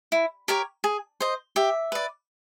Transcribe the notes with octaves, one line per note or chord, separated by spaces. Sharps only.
E4
G4 A#4 C#5
G#4
C5 D#5
G4 E5
B4 D5